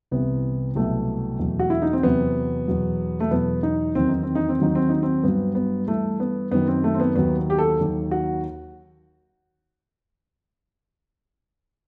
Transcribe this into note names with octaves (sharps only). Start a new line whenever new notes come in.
C2 C3 E3 B3
C2 B2 F#3 A3
E2 B2 F#3
F#4
E4
D#4
C4
E2 C3 F#3 B3
E2 B2 F#3
A3
E2 B2 F#3 B3
D#4
E2 D#3 F#3 C4
D#4
C4
D#4
C4
D#2 D#3 F#3 D#4
C4
D#4
C4
G2 F#3 B3
B3
G2 E3 A3
B3
F#2 D#3 F#3 B3
C4
A3
C4
B3
D#2 D#3 F#3 B3
G4
A4
D#2 D#3 F#3
F#4